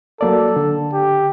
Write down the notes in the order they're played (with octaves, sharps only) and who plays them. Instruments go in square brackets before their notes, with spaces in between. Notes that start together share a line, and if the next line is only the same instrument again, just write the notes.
[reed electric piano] F#3 A#3 D5 [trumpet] A4
[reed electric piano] D3
[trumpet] G4